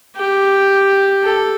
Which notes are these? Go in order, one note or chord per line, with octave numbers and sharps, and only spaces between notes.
G4
A4